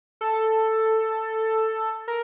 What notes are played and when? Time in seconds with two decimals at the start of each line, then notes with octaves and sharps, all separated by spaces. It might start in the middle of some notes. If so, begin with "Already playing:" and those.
0.21 A4
2.08 A#4